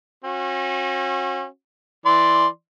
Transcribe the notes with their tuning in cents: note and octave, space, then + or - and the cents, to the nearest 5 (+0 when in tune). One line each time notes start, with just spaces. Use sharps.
C#4 -40 F#4 -30
E3 +5 D5 +0 C6 +0